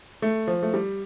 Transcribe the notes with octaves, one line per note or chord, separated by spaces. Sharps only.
A3
F3
A3
G3